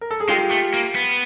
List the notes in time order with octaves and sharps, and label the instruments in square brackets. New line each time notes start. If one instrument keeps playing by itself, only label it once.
[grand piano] A#4
A4
G#4
[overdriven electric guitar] G#3 [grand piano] F4 G4
[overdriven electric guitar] A3
A#3
B3